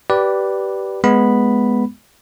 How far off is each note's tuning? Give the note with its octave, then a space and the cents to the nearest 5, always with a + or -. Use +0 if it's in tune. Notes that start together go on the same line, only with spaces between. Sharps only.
G4 -20 B4 -5 D5 +0
G#3 +10 B3 +0 B5 +0